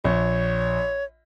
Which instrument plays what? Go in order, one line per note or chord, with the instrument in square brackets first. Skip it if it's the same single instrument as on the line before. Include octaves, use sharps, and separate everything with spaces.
[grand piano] A#1 [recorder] C#5